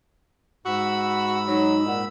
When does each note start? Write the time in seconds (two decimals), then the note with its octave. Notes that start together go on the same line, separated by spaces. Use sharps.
0.66 G#2 F#4 B5 E6
1.48 F#3 D#4
1.87 A#2 F#5